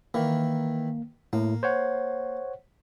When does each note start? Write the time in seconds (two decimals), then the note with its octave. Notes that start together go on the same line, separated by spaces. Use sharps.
0.14 D#3 E3 A#3
1.33 A2 A#3
1.63 C5 C#5 F#5